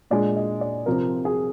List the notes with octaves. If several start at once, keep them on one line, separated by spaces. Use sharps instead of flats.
A#2 G#3 D4 D5
D#5
D5
C3 F3 C4 A#4
G#4